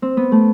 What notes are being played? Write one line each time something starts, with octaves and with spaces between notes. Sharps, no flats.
C4
B3
A3